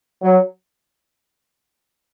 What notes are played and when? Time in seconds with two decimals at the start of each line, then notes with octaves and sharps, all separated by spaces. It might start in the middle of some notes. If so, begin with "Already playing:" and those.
0.22 F#3